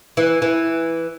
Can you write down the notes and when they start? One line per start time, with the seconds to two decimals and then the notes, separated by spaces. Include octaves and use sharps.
0.17 E3
0.42 E3